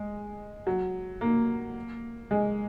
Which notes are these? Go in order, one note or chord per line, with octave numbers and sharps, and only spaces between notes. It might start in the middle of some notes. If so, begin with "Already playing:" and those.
Already playing: G#3
F#3
A#3
G#3